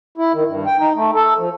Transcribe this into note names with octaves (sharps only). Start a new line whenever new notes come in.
E4
D#3
G2
G5
D#4
A3
A4
F3